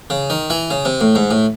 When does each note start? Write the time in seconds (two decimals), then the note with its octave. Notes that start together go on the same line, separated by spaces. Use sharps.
0.10 C#3
0.30 D#3
0.50 E3
0.70 C#3
0.85 C3
1.01 A2
1.15 G#2
1.31 A2